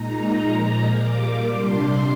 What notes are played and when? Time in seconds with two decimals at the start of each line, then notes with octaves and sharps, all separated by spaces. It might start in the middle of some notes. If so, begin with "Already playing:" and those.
Already playing: A#2 G#3 D#4 A#5
0.42 A#2 F3 G#3
0.95 A#2 G3 A#3 D6
1.49 C3 G3 D4 C6